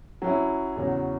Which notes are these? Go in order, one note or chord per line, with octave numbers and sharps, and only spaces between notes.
F#3 C#4 E4
E2 C#3 F#3 C#4 F#4